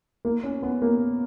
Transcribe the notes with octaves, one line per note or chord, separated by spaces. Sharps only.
A#3
C#4
B3
A#3